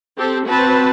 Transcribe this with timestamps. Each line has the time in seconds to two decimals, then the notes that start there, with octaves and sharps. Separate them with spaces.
0.17 C4 G4 A4
0.47 C4 F#4 B4 A5